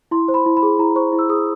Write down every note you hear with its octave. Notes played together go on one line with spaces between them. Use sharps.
E4 C6
C5
B5
E4
B5
G#4
E4 A#5
C5 C#6
E4
E6
G#4 D#6